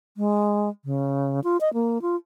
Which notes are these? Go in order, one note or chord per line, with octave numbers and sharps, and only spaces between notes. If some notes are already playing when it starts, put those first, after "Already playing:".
G#3
C#3
F4
D#5
A#3
F4